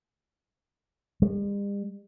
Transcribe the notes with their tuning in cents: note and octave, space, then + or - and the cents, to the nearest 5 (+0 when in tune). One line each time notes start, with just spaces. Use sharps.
G3 +45